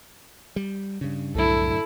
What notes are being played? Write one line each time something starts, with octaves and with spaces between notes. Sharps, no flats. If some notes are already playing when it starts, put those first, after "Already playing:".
G3
G2 C#3
C2 F#2 A2 D3 E4 A4